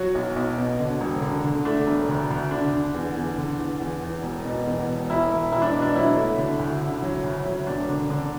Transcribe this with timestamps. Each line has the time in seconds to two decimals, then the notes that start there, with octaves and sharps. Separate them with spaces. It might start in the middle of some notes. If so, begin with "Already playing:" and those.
Already playing: F#3 F#4
0.15 B1
0.36 B1
0.58 B2
0.80 D3
1.01 E1
1.22 D3
1.44 D3
1.65 A3 D4
1.87 E1
2.08 D2
2.30 D2
2.51 D3 D4
2.73 D3
2.94 E2
3.16 E2
3.37 D3
3.59 E2
3.80 E2
4.02 E2
4.23 E1
4.45 B2
4.66 E2
4.87 E1
5.10 E1 E4
5.30 E1
5.52 E1 E4
5.62 D4
5.73 B2
5.82 D4
5.95 F#3 E4
6.16 A3
6.38 D3
6.59 D2
6.81 D3
7.02 F#3
7.24 D2
7.45 F#3
7.67 E1 D4
7.89 D3
8.10 D3